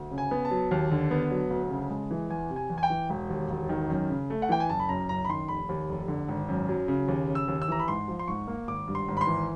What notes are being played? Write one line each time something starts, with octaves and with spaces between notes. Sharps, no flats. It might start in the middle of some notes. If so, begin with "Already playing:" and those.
Already playing: D2
C#3
G#5
B3
A5
F#3
D#2
D3
B3
F#3
D2
C#3
G#3
E3
E2 G#5
C3
G#5
E2
G#5
G5
E3
E1
D#2
E1
D#3
F#2
C#3
A3
F#5
E3 G5
G#5
F#1 A5
B5
F#2 A#5
F#1 A#5
B5
D#3 C6
F1 B5
D#2
F1
D3
G#1
F#2
F#3
C#3
D#2
C#3
E6
D#2
E6
E3 A#5
B5
G#2 C6
F3
C6
G#2 C#6
A#3
G#1 D6
G2
C6
G#1
B5
C6
E3